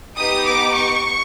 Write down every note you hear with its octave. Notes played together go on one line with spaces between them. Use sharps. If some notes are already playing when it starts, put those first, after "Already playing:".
B3 D#4 G4 D#6
D6
C#6